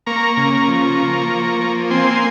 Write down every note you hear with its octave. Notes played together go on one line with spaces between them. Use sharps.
A#3 A#5 C#6
C#3
F3
A#3
F3
A#3
C4 G#5 C6